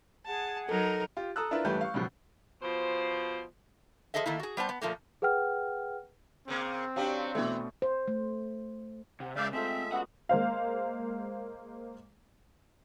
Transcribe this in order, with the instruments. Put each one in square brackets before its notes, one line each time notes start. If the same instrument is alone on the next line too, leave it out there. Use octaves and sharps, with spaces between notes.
[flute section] G#4 F#5 [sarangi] A5
[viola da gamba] F#3 D#4 [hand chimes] A4 [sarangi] A#4
[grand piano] F4 G4
A4 A#5 D#6 E6 F#6
D4 E4 F4 A#4 B4 E5
A1 G2 A3 G4 B4 G6
F5 C#6
C#2 F#2 B2 F3
[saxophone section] B2 F3 C5
[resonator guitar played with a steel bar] F3 A3 G#4 A4 D#5 E5
D#3 A3 A#3 E4
F#4 G#4
G3 B3 C5 A5
B3
A#2 F3 A3 A#3
[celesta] G#4 B4 F#5 G5 F6
[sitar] C#3 A#3 [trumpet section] C4
[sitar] F#3 C#4 D4 [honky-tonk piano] G4 F5
[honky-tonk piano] B2 A3 [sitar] E3
[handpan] C5
A3
[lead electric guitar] C3 [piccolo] F#5
[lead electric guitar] C#3 G#3 [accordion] D5 E5 F5 [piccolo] G6
[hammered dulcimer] G#3 A3 F4 [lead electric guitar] C4 [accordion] E5 [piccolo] B6
[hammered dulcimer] B3 C#4 [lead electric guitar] F#4 F#5
[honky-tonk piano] G#3 A#3 C5 F5